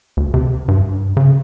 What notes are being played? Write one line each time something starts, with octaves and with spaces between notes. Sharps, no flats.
D2
C3
G2
C#3